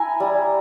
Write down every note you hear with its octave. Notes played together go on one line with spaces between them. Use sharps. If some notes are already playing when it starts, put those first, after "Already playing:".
Already playing: E4 G#5 A#5
G3